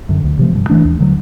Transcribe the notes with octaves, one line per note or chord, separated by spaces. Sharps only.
F#2 D3
D2
C3 F3 A3
G2
E3 A3 D4
D#2
D3 F#3